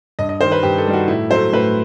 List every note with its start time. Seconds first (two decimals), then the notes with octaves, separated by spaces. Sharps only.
0.19 G2 D#5
0.29 D#5
0.41 D#3 G3 C5
0.52 B4
0.63 G2 G4
0.78 A4
0.86 D#3 G3
0.93 F#4
1.08 A2 E4
1.31 F#3 A3 C5
1.53 A2 B4